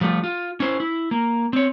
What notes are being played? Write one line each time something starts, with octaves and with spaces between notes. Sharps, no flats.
F3 G3 A3 F4
F4
C#4 E4 C5
E4
A#3
C4 C#5